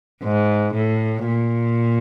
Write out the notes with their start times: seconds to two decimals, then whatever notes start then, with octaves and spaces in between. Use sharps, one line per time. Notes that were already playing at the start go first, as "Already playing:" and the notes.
0.23 G#2
0.74 A2
1.26 A#2